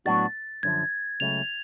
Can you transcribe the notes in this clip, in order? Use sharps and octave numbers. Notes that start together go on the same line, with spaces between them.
A2 F#3 B3 D4 F#4 A6
F#2 D3 F3 G#6
C#2 C#3 F#3 A3 F7